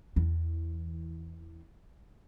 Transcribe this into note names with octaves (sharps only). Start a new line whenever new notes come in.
E2 E3